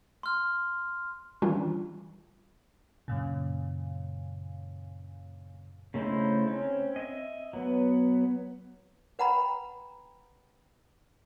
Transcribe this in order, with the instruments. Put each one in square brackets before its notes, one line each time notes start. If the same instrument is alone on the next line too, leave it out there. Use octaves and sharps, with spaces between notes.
[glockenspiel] C6 F6
[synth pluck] D#3 E3 G3 C#4 D4 F4
[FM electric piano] F#2 A#2 C#3
[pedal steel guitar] C#3 A3 D#4 E4 C5
C4 C#4
D#5 E5
F#3 B3
[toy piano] B4 F#5 G5 A#5 B5